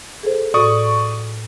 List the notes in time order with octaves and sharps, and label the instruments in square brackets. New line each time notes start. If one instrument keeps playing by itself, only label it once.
[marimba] G#4 A4 C5
[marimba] A2 F#4 A4 [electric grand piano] D5 C#6 D#6